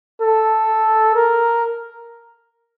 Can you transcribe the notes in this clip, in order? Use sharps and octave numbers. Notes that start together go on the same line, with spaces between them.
A4
A#4